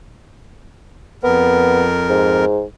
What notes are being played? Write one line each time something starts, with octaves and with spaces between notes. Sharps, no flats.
F2 B3 A#4
G#2